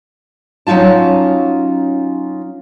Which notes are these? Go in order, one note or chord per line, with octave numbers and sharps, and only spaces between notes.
F#3 C#4 D#4 F4 A5